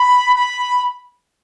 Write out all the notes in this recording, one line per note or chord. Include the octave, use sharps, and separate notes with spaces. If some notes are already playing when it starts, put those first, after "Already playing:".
Already playing: B5
B5